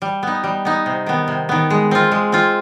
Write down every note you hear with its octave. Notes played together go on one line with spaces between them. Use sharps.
G3
B3 D#4
G3
B3 D#4
C3
D#3 B3
C3
D#3 B3
G#3
C4 F4
G#3
C4 F4